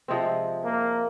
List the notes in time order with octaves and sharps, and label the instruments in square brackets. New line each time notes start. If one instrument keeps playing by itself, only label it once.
[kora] C3 F3 G#3 C4
[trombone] A#3